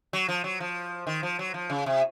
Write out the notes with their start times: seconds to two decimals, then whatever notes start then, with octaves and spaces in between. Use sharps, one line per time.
0.13 F#3
0.28 F3
0.44 F#3
0.60 F3
1.07 D#3
1.23 F3
1.39 F#3
1.54 F3
1.70 C#3
1.86 C3